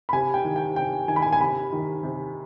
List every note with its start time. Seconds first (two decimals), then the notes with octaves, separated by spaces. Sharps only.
0.09 B5
0.13 C3 G#5
0.34 G5
0.44 D#3
0.56 G5
0.76 C3 G5
1.08 D#3 G#5
1.16 B5
1.22 G#5
1.32 G#5
1.40 C3 B5
1.73 D#3
2.03 C3